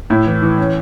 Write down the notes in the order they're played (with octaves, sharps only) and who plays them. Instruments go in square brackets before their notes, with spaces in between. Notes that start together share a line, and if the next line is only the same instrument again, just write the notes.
[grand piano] A2 E4
E3
E3
C#4